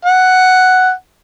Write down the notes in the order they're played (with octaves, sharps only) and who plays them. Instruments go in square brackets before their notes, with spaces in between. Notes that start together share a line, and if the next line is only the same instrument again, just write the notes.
[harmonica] F#5